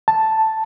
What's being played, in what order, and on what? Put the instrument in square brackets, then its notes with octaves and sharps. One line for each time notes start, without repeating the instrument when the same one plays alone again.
[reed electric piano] A5